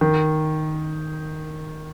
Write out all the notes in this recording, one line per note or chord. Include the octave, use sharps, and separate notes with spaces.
D#3